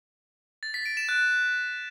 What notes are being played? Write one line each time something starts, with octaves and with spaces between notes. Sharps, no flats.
A6
B6
D7
E7
F#6